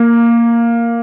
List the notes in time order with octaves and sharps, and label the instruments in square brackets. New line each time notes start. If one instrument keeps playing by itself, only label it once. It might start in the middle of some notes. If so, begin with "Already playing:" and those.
Already playing: [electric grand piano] A#3